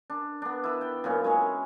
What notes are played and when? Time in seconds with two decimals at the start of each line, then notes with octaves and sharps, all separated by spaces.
0.10 D4
0.42 B3 D4
0.64 E4 B4
0.81 G5
1.04 F#2 A#2 C#4
1.24 G#3 G#4 C#5